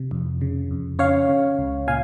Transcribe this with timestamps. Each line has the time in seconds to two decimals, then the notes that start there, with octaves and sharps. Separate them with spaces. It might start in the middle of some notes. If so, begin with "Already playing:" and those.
Already playing: C3
0.11 F2
0.41 C#3
0.71 F2
0.99 C#4 C#5 F5
1.29 C#3
1.58 C#2
1.88 A#2 F5 G#5